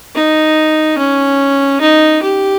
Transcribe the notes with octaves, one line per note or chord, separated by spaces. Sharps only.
D#4
C#4
D#4
G4